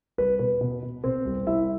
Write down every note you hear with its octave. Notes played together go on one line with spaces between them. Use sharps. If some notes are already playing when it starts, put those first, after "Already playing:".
C2 B4
B2 B4
B2
B2
B2 C4 C5
C2
C2 E4 E5